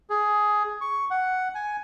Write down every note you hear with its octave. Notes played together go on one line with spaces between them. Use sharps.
G#4
C#6
F#5
G#5